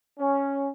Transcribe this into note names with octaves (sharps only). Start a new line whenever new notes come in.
C#4